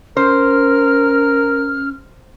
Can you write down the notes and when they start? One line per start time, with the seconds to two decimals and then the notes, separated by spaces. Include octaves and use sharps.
0.17 C#4 A#4 C5 F6